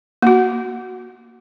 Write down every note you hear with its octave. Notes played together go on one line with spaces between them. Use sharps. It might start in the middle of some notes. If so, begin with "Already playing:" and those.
A#3 F#4